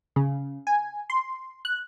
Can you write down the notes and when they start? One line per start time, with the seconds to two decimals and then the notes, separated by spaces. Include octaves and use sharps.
0.16 C#3
0.67 G#5
1.10 C6
1.65 F#6